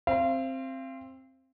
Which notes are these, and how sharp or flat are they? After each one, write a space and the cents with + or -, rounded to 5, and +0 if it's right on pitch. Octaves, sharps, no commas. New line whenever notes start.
C4 +10 F5 -35